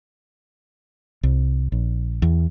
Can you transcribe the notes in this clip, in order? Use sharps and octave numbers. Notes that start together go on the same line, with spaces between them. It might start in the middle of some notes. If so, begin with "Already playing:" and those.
C2
A#1
E2